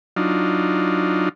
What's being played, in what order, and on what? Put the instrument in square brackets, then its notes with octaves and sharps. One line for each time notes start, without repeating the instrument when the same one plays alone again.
[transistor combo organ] F#3 D4 D#4 F4